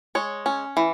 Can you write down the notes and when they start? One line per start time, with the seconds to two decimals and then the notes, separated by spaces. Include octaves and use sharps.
0.15 G#3 C#5
0.46 C#4
0.77 E3